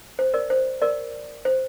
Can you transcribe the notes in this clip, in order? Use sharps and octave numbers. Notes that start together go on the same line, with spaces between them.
C5
A#4 D5
C5
A#4 D5
C5